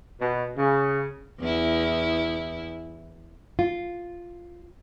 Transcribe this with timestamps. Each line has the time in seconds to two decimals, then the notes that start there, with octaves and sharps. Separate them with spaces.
0.21 B2
0.57 C#3
1.40 E2 E4
3.59 F4